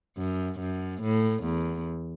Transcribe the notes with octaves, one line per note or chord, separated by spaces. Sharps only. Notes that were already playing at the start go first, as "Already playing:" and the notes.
F#2
F#2
A2
E2